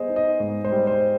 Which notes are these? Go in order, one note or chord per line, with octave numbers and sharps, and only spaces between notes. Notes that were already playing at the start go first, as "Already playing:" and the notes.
Already playing: G3 B3 G#4 C5 D#5
D#4
D#5
G#2
C5
G3
C5